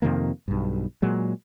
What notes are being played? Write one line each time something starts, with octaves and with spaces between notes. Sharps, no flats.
F2 C3 D#3 A#3
B1 G2
A#2 F#3 G#3